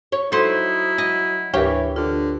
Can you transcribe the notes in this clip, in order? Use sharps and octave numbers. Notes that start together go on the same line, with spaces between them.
C#5
F#3 D#4 E4 A4 C5
D#5
D2 G#2 E3 G4 A#4 C#5
D3 F4 B4